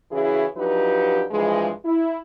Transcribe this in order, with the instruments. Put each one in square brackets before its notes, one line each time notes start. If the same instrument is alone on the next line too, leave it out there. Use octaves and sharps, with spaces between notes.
[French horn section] C#3 E3 C#4 E4 F#4 G#4
F3 F#3 D4 D#4 G4 B4
G2 E3 F3 G#3
E4